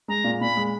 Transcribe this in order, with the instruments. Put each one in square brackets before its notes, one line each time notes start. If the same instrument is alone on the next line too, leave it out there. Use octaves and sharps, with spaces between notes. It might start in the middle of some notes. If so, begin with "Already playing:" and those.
[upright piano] G#3 [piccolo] A#5
[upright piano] A#2
[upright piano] A#2 [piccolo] B5
[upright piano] G#3